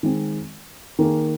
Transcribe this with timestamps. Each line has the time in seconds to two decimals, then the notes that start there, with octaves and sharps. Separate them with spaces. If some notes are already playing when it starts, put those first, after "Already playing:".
0.03 D#3 G#3 C4
0.99 D#3 A#3 G#4